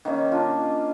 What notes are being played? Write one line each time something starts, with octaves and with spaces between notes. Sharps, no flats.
D#3 A#3 C#4
D4 F4